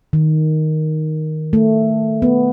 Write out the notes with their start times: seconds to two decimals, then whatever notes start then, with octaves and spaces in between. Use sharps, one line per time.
0.13 D#3
1.53 A3
2.22 B3